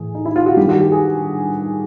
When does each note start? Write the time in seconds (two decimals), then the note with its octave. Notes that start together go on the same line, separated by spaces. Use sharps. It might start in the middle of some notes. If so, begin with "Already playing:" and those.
Already playing: A2 E3 G#4
0.15 D#4
0.25 E4
0.36 F4
0.46 F#4
0.57 G2 D#3 F#3 G4
0.69 F#4
0.80 G4
0.92 G#4